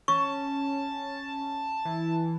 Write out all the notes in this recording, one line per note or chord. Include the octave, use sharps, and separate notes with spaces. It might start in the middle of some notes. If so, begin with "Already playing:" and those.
C#4 A5 C#6
E3